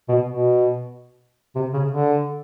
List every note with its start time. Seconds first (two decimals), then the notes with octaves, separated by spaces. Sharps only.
0.09 B2
0.27 B2
1.55 C3
1.73 C#3
1.91 D3